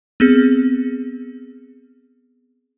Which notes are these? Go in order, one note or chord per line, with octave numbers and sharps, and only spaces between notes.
B3 C4 G#4